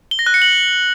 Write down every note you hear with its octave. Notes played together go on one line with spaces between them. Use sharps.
G7
A#6
F#6
C#7
F#7